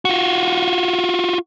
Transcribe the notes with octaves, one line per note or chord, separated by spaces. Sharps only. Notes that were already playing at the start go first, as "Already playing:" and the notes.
F4 F#4